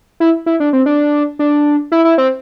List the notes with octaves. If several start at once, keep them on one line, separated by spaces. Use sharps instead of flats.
E4
E4
D4
C4
D4
D4
E4
E4
C4